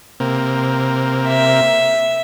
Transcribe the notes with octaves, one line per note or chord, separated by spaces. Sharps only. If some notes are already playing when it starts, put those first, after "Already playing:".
C3 A#3
E5